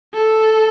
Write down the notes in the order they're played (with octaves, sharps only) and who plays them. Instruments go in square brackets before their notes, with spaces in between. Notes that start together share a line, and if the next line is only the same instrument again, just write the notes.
[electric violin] A4